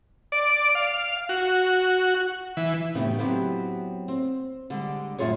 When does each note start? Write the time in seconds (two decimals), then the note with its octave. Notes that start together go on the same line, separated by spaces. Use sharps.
0.32 D5
0.75 F5
1.29 F#4
2.57 E3
2.95 F#2 A2 C#3 B3 D#4 G4
3.19 F#3 B3 C4 E4 G4 B4
4.08 C4
4.70 D3 G3 G#3
5.18 F#2 A2 F4 G#4 C#5